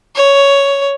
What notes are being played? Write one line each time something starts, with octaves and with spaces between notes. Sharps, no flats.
C#5